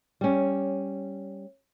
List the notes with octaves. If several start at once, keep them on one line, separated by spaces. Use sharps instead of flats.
G3 C#4